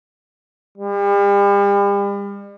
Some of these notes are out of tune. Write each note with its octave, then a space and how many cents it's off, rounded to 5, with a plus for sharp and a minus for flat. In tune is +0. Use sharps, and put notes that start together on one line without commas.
G3 +40